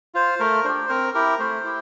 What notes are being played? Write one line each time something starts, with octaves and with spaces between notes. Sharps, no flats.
F4 C5
A3 A#4
D4 G4 C5
C4 A#4
E4 G4 A#4
A3 C5
E4 G4